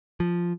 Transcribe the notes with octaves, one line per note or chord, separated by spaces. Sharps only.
F3